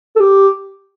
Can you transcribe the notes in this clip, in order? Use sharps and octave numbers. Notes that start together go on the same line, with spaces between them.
A4
G4